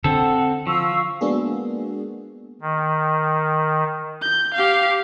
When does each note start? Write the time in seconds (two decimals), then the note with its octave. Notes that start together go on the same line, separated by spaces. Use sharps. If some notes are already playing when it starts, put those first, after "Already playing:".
0.04 D3 C4 A4 F#5
0.67 F3 F5 C#6 E6
1.21 G#3 A#3 B3 D4 F#4 G#4
2.61 D#3
4.22 G6
4.54 G4 F5